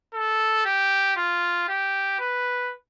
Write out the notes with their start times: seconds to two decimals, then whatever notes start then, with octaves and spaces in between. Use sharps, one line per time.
0.14 A4
0.65 G4
1.16 F4
1.69 G4
2.19 B4